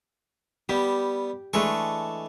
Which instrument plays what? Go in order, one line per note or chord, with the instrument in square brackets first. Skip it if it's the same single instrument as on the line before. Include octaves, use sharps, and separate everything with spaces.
[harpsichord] G3 B3 [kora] G4
[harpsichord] E3 A4 C#6 [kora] G#3 A3 D4